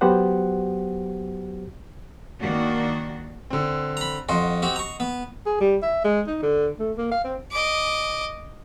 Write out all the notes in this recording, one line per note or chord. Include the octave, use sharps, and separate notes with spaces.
F#3 B3 F#4 G4 C5 F#5
D#3 A#3 D4 F#4
D3 C4
A#5 B5
F2 F#4 D#5 F#5 C6
C4 F#4 G4
A#5 C#6
B3
G#4
G3
E5
G#3
D#4
D3
A3
A#3
F5
C4
D#5 D6